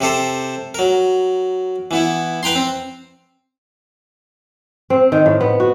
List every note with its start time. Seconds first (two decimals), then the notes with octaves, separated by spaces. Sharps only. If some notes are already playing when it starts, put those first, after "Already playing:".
0.01 C3 G4 A4 C5
0.75 F#3 A#4
1.91 E3 B3 E4
2.43 B4 G5 A#5 C6
2.56 C4
4.90 C4
5.12 D#3
5.26 A2
5.41 B3
5.60 F#4